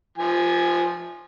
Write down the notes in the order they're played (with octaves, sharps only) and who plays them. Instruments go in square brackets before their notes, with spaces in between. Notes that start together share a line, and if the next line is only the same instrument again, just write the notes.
[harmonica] F3 G#5